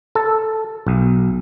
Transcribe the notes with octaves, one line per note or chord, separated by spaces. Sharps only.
A4
B1